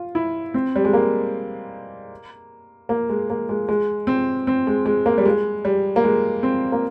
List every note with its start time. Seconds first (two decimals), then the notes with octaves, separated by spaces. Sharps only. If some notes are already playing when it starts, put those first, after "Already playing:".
Already playing: F4
0.15 E4
0.54 C4
0.76 G3
0.85 G#3
0.93 A#3
2.89 A#3
3.10 G#3
3.30 A#3
3.49 G#3
3.69 G#3
4.07 C4
4.47 C4
4.67 G#3
4.86 G#3
5.06 A#3
5.18 G3
5.25 G#3
5.65 G3
5.96 A#3
6.04 G#3
6.43 C4
6.72 A#3